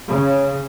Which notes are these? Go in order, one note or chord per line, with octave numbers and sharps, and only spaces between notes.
C#3